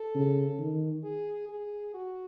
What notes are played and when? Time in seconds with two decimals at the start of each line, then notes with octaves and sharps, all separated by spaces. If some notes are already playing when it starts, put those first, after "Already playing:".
Already playing: A4
0.15 C#3
0.59 D#3
1.04 G#4
1.49 G#4
1.94 F#4